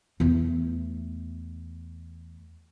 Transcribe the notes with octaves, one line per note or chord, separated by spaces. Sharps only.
E2 A3